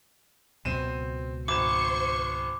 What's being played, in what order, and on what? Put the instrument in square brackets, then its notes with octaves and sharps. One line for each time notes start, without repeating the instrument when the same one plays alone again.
[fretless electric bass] C#2 B2 F#3 [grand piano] C4 D#7 E7
[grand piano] G#1 E7 [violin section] C5 C#6 [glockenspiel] D6